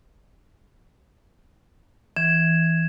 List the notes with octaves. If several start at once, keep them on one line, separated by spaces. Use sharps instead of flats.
E3 G#6 E7